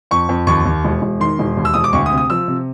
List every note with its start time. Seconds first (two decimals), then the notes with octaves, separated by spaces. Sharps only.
0.11 F2 C#6
0.29 F2
0.47 D#2 C#6
0.65 D#2
0.85 E1
1.02 E1
1.20 D#3 C6
1.39 E1
1.57 D#2
1.65 E6
1.74 E1 D#6
1.84 D6
1.93 D2 C#6
2.06 D#6
2.11 C3
2.18 D#6
2.30 F3 E6
2.48 C3